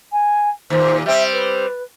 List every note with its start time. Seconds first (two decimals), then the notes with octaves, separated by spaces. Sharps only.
0.12 G#5
0.70 D#2 A#2 C5
1.06 G3 C4 E5
1.32 B4